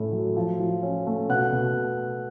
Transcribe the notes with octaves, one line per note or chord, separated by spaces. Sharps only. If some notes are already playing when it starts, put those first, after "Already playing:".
Already playing: A2 A3 C#4
F#3
F3
F3
C#4
A3
B2 F#5 F#6
B2